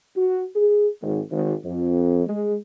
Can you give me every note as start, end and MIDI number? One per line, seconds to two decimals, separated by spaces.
0.16 0.45 66
0.56 0.87 68
1.02 1.20 32
1.31 1.53 32
1.64 2.25 41
2.27 2.55 56